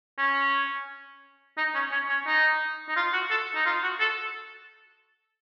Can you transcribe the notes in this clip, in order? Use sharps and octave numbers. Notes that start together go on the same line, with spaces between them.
C#4
D#4
C#4
C#4
C#4
D#4
D#4
F4
F#4
A4
D#4
F4
F#4
A4